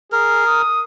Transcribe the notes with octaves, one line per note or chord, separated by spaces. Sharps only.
G#4 A#4
D#6